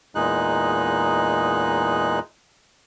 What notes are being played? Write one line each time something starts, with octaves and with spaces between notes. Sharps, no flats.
E2 A#2 G#3 D#4 F#6